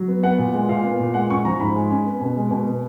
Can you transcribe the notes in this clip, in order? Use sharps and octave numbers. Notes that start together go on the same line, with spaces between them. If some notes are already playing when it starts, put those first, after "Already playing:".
Already playing: F#3
B3
B3 F#5
A#2
G#3
A#2 F5
B3
A#2
G#3 F#5
C#4 C#6
F3 A#5
G#2 B5
G#3
C#4
B3
B2
G#3
B2
B3